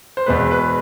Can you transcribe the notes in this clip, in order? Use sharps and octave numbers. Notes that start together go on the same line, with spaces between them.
C5
E2 B2 G#3 B4
B4